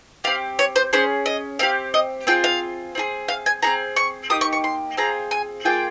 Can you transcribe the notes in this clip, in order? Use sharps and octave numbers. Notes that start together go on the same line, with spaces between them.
C4 G4 F5
C#5
C5
C#4 G#4 C5
D#5
C4 G4 F5
D#5
C4 F4 G#4 G5
F5
C4 F4 G#4
F5
G#5
C4 D#4 G#4 A#5
C#6
A#3 D#4 G4 D#6
C#6
C#6
C6
C4 F4 G#4 A#5
G#5
A#3 F4 G#4 G5